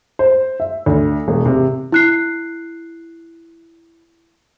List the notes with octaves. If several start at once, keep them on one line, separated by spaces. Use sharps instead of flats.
C5
E5
D2
E1
C3
E4 F#6 C7